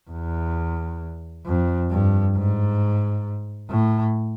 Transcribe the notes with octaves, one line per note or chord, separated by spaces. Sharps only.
E2
F2
G2
G#2
A2